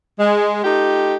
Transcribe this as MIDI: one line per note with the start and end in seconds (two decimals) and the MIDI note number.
0.19 0.60 56
0.64 1.15 57
0.64 1.15 63
0.64 1.15 65
0.64 1.15 67